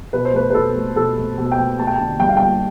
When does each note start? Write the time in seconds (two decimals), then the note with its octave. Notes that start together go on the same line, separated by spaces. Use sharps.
0.13 B2 B4
0.25 C5
0.34 A3 B4
0.50 B4
0.54 B2 A4
0.76 A3
0.96 B2 A4
1.17 A3
1.38 B2
1.52 G5
1.58 A3
1.79 A3 A5
1.87 G5
1.96 D3 A5
2.20 G2 G5
2.29 F5
2.37 G2 G5